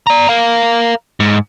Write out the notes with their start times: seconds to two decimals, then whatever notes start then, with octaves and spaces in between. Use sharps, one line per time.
0.07 D5 A#5
0.29 A#4 F5
1.20 G#2